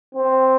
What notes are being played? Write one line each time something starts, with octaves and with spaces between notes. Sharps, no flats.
C4